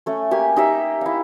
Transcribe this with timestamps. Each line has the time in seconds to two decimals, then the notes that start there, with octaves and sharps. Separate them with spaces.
0.06 A3 C#4
0.31 A#3 G4 G#5
0.56 D#4 G4 E5
1.01 E4 F5